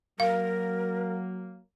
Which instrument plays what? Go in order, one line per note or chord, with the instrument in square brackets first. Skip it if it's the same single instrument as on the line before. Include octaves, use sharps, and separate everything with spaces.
[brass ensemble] F#3 A#3 [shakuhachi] A#4 [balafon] F5